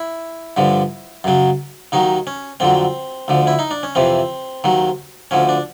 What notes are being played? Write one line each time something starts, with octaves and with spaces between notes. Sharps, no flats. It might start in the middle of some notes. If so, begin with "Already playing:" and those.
Already playing: E4
G2 D3 F3
F#2 C#3 F#3
D#2 D#3 F#3 D#4
C#4
F2 D3 F#3 C4
D2 D3 F3
E4
D#4
D4
C#4
F2 C3 E3 C4
D#2 D#3 F#3
D2 D3 F3 C#4
D4